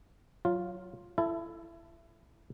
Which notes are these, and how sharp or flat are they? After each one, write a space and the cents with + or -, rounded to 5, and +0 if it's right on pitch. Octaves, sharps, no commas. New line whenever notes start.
F#3 +0 F4 +0
E4 +25 A4 +0